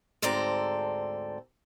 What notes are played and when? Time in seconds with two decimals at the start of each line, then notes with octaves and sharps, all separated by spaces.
0.22 D2 G#2 C4 A4 D5 A#5